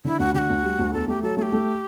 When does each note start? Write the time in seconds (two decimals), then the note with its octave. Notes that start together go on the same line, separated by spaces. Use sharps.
0.05 D3 E4
0.19 D2 F#4
0.34 D3 G4
0.38 F#4
0.50 D2
0.63 G3
0.78 D2
0.93 E2 A4
1.08 A3 G4
1.23 F#3 A4
1.37 A3 A4
1.42 G4
1.52 A3